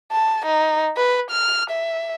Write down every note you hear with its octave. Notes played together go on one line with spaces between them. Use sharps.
A5
D#4
B4
F6
E5